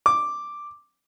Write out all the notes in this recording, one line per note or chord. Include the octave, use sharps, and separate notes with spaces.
D6